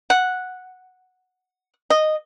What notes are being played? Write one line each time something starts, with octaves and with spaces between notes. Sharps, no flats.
F#5
D#5